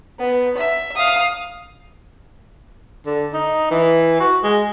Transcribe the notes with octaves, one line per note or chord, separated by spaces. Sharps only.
B3
E5
F5 D#6
D3
D#4
E3
F#4
G#3